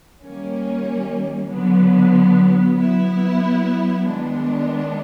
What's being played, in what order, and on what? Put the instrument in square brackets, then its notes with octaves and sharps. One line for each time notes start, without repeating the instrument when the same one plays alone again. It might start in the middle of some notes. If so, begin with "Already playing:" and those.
[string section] D#3 G3 A#3 C#4
D3 F#3 B3
F#3 B3 E4
D#3 G#3 B3 D4